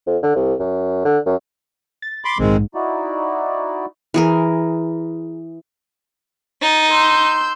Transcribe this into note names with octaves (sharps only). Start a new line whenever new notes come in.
F2
D3
C2
F#2
D3
F#2
A6
B5 C6 D6
A#1 G#2 D#3 G#3 C4
D#4 E4 F#4 D5
E3 G#4 A#4
D#4 A6
C6 E6 G6